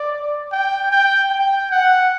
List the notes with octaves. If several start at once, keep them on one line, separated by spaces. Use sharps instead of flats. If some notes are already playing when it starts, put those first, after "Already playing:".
Already playing: D5
G5
G5
G5
F#5